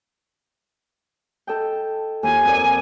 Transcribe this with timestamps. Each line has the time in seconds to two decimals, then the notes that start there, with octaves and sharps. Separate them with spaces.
1.47 A4 D#5 G5
2.23 D#2 F4 G#5
2.44 F2 A#4 D5